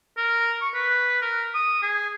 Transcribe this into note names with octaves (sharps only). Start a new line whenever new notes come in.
A#4
C#6
B4
A#4
D#6
G#4